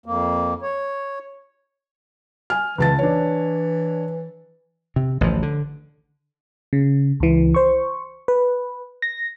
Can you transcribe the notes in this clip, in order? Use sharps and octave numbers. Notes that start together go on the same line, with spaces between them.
F2 A#3
C#5
G#5 F6
C#2 E3 A5 A6
E3 D4 C#5
C3
A1 D2 F3
D3
C#3
C#2 E3
C5 C#6
B4
A#6